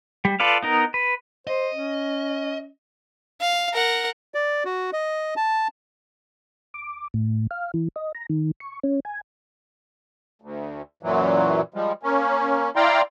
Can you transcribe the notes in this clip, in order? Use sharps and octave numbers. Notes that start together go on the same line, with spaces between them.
G3
F4 A4 B4 D5 F5
B3 D#4 A#4
B4
C5 D#5
C#4
F5
A#4 F#5
D5
F#4
D#5
A5
D6
A2
F5
E3
D#5
A#5
D#3
C#6
C#4
G#5
D2
F#2 A#2 E3 F#3
F3 G3 G#3
A#3 C#4
E4 D5 F5 G5 A#5 C6